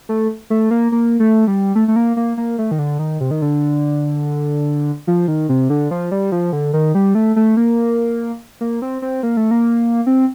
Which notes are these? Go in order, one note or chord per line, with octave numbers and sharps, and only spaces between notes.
A3
A3
A#3
A#3
A3
G3
A3
A3
A#3
A#3
A#3
A3
D#3
D3
D#3
C3
D#3
D3
F3
D#3
C3
D3
F3
G3
F3
D3
D#3
G3
A3
A3
A#3
A#3
C4
C4
A#3
A3
A#3
C4